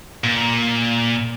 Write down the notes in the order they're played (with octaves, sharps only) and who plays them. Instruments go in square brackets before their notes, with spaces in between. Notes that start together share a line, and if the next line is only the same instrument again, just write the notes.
[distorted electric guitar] A#2